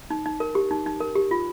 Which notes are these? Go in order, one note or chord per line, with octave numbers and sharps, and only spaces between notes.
D#4
D#4
A#4
G4
D#4
D#4
A#4
G4
F4